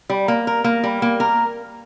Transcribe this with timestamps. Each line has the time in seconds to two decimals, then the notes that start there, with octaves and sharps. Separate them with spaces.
0.10 G3
0.28 A#3
0.47 A#4
0.64 A#3
0.83 G3
1.02 A#3
1.20 A#4